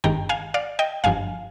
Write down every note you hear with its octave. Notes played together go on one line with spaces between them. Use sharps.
G1 G2 D#3 G#3 G5 A#5
F5 G#5
D5 F5
D#5 G5
G1 G2 F3 F5 G#5